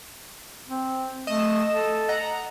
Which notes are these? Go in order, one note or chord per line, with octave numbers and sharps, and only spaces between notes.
C4
A3 D#5 E7
A4
D#5 F#5 A#5